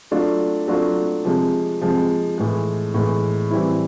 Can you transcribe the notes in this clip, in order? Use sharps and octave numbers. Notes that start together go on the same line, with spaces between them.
F#3 A3 D4 F4
F#3 A3 D4 F4
C3 F3 G#3
C3 F3 G#3
A2 E3 G#3
A2 E3 G#3
E3 G3 C4 E4